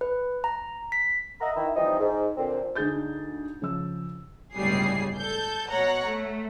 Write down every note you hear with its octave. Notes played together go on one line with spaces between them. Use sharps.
B4
A#5
B6
D#5 E5 F#5 A#5
D#3 E4
E3 F3 G3 C4 D#4
G#2
A#2 D3 C4
D2 D4 D#4 G#4 G6 A6
C#3 F3 E6
G1 C#2 A2 G3 G#4 C7
A4 G6
B2 C#5 F#5 A#5
A3